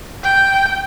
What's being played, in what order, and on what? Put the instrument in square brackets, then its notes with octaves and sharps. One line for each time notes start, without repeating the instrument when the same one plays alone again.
[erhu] G5